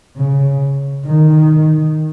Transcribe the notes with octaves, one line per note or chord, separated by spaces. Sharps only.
C#3
D#3